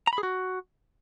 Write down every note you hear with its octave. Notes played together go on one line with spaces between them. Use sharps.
A#5
B5
G#4
F#4